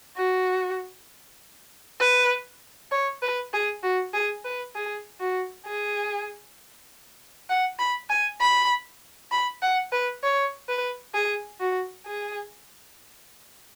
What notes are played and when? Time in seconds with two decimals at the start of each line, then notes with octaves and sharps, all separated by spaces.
0.17 F#4
2.00 B4
2.92 C#5
3.22 B4
3.53 G#4
3.83 F#4
4.14 G#4
4.45 B4
4.75 G#4
5.21 F#4
5.66 G#4
7.49 F#5
7.79 B5
8.10 G#5
8.40 B5
9.32 B5
9.62 F#5
9.92 B4
10.23 C#5
10.69 B4
11.14 G#4
11.61 F#4
12.07 G#4